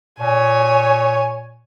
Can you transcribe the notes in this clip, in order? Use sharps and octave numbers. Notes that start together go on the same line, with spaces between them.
A#2 C#5 G#5